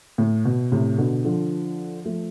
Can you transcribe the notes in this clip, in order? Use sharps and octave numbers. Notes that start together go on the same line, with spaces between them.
A2
B2
A2 C3
B2 D3
D3 F3
F3 A3